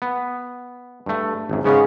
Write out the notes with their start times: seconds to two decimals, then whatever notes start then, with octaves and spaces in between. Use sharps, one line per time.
0.02 B3
1.06 G2 A3
1.50 G#1 F#2
1.64 G#2 C#3 B3 C#4